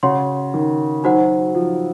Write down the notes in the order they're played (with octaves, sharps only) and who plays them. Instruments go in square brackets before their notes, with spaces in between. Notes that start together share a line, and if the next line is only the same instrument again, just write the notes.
[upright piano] C#3 [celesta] F#4 C#5 F#5 C6
[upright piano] D#3
[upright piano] F#3 [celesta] D#4 F#4 C5 F#5
[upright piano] F3